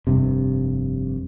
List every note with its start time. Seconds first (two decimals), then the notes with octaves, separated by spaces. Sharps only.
0.07 F1 G2 C3